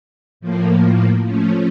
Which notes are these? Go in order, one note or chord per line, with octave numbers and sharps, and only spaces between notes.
A2 F3 A#3
F3 A3 C#4